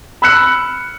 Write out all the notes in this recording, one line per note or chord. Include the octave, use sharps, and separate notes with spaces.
B5 E6 F#6 C#7 F#7